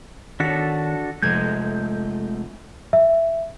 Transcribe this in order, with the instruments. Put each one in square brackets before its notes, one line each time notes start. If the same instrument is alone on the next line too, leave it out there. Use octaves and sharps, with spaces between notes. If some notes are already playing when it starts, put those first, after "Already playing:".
[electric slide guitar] D#3 C#5 [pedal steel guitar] D4 F#4 A4 [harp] B6
[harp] F1 G#6 [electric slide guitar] G#3 A3 D#5 [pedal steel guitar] G6
[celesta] E5